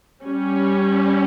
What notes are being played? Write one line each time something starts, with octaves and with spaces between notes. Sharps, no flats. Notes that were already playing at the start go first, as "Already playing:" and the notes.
G3 C#4